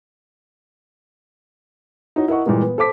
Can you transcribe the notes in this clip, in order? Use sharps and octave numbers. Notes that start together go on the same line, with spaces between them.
D#4 E4 F#4 C#5
E4 A#4 D#5 F#5 C#6
A#2 E3 G3 G#3 A#3
B3
A4 C5 D6 B6